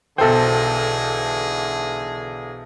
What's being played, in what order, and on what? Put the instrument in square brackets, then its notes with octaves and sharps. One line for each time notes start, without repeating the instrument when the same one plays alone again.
[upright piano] B1 C5 [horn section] D3 E3 G#4 [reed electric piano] A4 G5